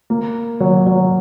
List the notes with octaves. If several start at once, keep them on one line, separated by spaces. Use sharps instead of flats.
A#3
F#3
F#3